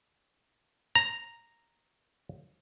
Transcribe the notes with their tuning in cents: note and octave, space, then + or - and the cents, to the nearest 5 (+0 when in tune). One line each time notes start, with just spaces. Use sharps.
A#5 +0